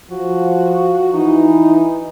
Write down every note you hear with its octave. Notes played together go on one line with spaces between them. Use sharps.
F3 F#4
E3 D#4